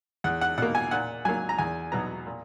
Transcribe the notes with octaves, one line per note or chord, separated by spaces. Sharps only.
E2 F#5
F#5
B2 A#3 F#5
G#5
A#2 F#5
F#3 A#3 G#5
A#5
E2 G#5
B2 F#3 B3 A#5
A#2